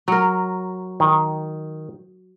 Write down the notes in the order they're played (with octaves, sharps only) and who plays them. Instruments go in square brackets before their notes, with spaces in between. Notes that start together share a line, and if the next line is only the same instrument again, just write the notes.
[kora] F#3 A#4
[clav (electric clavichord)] D#3